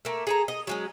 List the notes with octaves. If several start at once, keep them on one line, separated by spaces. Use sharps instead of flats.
A3 A#3
G#4 A4 A#5
D#5
F#3 G#3 C#4